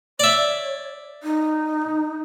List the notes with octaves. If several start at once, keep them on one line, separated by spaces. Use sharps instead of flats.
C#5 D5 E5
D#4